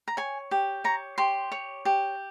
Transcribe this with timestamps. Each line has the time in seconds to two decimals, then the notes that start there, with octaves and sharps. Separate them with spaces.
0.08 A#5
0.17 C#5 G#5
0.51 G4
0.84 C#5 A#5
1.18 G4 C6
1.52 C#5
1.85 G4